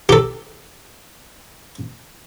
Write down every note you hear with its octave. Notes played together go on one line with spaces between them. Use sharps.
G4 A4